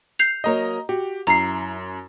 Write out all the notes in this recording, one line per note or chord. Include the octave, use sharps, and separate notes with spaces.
G6 C7 F7
F#3 A#3 C#5 D#5 A#5
F#4 G4
F#2 E4 A#5 C7